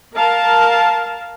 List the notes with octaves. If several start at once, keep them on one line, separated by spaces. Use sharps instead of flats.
A#4 F5 A5